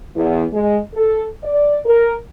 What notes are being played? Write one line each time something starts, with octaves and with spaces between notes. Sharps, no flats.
E2
G#3
A4
D5
A#4